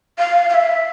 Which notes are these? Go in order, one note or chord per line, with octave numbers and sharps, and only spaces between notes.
F5
F5
E5